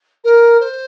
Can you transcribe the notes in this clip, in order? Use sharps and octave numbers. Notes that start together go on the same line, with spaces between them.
A#4
C5